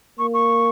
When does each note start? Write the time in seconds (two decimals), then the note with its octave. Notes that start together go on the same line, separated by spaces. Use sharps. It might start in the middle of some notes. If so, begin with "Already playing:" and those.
0.19 A#3 C#6
0.34 C#6